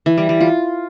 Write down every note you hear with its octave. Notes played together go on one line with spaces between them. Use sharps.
E3
G3
G3
F4